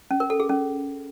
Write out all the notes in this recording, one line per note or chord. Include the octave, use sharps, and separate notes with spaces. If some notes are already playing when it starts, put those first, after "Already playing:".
C#4
A#4
A4
G#4
C#4